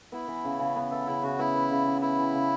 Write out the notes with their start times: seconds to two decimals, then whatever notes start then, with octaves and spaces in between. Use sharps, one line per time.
0.12 B3 E4
0.28 E3
0.44 C#3
0.59 C#3
0.76 B3
0.91 E3 A4
1.07 C#3 E4
1.23 C#3 F#4
1.39 B3 E4
1.55 E3
1.71 C#3
1.86 C#3
2.02 B3 E4
2.19 E3
2.34 C#3